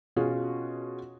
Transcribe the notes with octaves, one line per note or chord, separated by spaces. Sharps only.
B2 C#4 F4 F#4 G#4